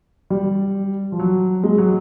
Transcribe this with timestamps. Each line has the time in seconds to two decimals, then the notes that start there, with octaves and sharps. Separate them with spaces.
0.30 G3
1.12 F3
1.19 F#3
1.64 G#3
1.78 F#3